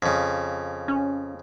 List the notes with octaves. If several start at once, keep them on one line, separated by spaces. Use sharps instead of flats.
F2 C#3
C#4